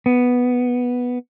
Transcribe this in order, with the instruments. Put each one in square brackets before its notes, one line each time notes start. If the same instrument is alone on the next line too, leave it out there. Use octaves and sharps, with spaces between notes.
[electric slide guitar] B3